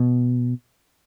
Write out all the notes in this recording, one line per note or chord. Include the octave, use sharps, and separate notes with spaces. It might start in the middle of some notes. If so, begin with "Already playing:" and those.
Already playing: B2